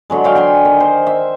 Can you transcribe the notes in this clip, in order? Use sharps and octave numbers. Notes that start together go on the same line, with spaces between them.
D3 F#3 G#3
F#3 F5 G5
G5 G#5 C6
D#3
C5
E5